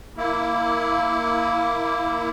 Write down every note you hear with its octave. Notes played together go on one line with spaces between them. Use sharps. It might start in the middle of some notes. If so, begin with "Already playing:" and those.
A#3 E4